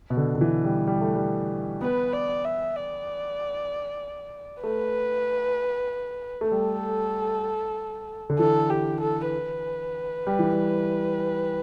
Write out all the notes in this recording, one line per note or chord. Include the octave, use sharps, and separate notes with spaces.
B2
D3
D3
E3
G3
G3
A3
G3
B3 B4
D5
E5
D5
A3 B4
A3
G3 A4
D3
E3 A4
G4
A4
B4
G3
E3
G3